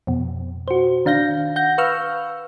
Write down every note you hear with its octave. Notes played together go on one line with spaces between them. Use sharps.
F2 B2
F#4 C5
D#3 D4 F5 G6 A#6
F#5 G6 A#6
B4 F5 C#6 E6 F6